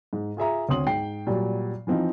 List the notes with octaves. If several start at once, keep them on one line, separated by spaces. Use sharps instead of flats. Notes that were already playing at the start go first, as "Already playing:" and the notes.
G#2
F4 G#4 E5 A#5
D2 C4 C#5 C6 D#6 F#7
G#2 G5 C7
A#2 F#3 G3
E3 F3 C4 D#4 F4